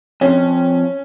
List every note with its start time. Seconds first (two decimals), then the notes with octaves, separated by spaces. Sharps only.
0.21 F2 C#4